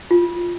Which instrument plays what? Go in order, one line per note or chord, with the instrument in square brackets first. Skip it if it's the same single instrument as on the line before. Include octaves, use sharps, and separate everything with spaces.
[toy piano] F4